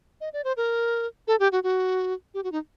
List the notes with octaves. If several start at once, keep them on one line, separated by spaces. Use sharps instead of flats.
D#5
D5
C5
A#4
A4
G4
F#4
F#4
G4
F#4
D#4